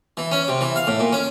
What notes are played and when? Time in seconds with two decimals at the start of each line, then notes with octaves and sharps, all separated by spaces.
0.17 E3
0.32 C#4
0.48 C3
0.61 E3
0.76 F5
0.87 A2
1.00 A#2
1.13 C#4